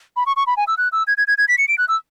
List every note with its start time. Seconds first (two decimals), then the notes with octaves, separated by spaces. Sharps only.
0.17 B5
0.26 C#6
0.36 C#6
0.47 B5
0.57 G#5
0.67 E6
0.78 F#6
0.92 E6
1.07 G#6
1.17 G#6
1.28 G#6
1.38 G#6
1.48 B6
1.58 C#7
1.68 D7
1.78 F#6
1.88 E6